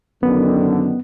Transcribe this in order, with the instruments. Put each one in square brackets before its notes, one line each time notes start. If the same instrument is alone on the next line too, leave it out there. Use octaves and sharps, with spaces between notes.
[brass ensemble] F#2 D3 D#3 [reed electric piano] B3